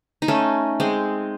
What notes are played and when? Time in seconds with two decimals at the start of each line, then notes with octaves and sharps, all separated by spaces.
0.22 D#4
0.28 A3 C#4
0.80 G#3 C4